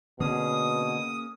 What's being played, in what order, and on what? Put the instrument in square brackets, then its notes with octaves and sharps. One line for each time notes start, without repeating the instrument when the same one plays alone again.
[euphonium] B2 [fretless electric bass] D3 C4 [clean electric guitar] A#3 C#4 G#4 [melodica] D#6